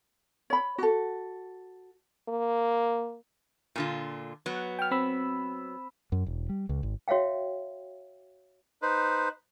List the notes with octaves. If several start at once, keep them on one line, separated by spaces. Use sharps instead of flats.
C#5 B5
F#4 A4
A#3
A#2 D3 F4
F#3 B3
G5 F6
C4 B5 E6
F#2
E1
G3
C#2
G#1
F#4 C#5 E5 F5 G5
D#4 B4 C5